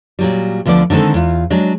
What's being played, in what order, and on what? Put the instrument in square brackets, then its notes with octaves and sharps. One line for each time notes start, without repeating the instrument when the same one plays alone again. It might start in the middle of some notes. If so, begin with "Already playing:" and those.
[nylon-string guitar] A#2 F#3 G3
D2 D3 F3 B3 D5
D3 D#3 G#3 C4 A4
E2 F4
F#3 G#3 D4